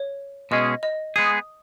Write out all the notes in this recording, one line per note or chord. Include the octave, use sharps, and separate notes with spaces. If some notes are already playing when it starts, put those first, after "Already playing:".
Already playing: C#5
B2 G#3 C#4 G#4 D#5
D#5
G#3 B3 G#4 D#6